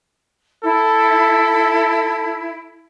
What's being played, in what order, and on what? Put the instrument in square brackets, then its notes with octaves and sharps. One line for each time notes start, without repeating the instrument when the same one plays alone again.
[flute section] E4 [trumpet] A4